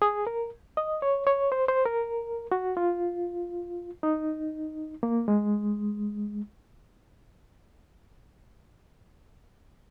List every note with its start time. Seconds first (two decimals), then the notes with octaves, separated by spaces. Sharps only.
0.02 G#4
0.27 A#4
0.77 D#5
1.02 C#5
1.27 C#5
1.52 C5
1.68 C5
1.86 A#4
2.52 F#4
2.77 F4
4.03 D#4
5.03 A#3
5.28 G#3